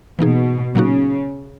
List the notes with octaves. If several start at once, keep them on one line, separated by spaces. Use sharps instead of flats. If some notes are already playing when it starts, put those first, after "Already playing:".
B2 E3 A#3 D#4 G#4
A#2 C#3 F#3 A#3 D#4 F#4